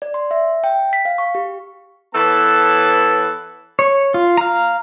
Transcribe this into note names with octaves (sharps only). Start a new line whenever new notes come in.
D5
C6
E5
G5
B6
F5
C#6
G4
E3 B3 A4 B4 C#5 A5
C#5
F4
F5 A#5